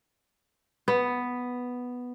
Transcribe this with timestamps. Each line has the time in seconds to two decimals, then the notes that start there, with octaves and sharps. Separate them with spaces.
0.88 B3